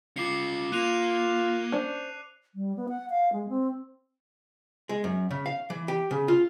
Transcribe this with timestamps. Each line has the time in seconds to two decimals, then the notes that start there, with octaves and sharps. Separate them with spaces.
0.16 C#4 F4 D6 C7 C#7
0.72 A#3 F4 F#6 D#7 F7
1.72 C#4 D4 C5
2.55 G3
2.76 B3
2.89 F#5
3.10 F5
3.33 G#3
3.49 C4
4.89 G#3
5.04 F#2
5.31 C#3
5.46 F5
5.70 E3
5.88 G4
6.11 C#3
6.28 F4